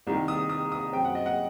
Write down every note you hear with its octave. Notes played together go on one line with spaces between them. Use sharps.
C2 C3 D#3
D#6
D#6
D#6
F#2 F#3 C4 G5
F#5
D#5
F#5